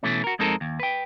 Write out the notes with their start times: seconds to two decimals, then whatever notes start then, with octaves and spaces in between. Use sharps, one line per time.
0.03 B2 E3 A3 C#4
0.24 F#4 A#4
0.39 F2 G#3 C4 D#4 A4 A#4
0.61 D#2
0.80 B4 G5